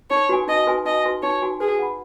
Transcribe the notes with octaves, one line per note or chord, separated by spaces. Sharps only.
D#4 C#5
F#4 B4 G#5
D#4 D#5
F#4 B4 G#5
D#4 D#5
F#4 B4 G#5
D#4 C#5
F#4 B4 G#5
G#4 B4
F#5 B5